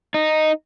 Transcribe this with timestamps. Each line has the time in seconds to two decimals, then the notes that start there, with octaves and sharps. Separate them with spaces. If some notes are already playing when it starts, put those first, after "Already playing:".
0.14 D#4